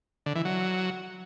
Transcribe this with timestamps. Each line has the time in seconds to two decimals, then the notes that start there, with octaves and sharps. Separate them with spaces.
0.26 D3
0.36 E3
0.45 F#3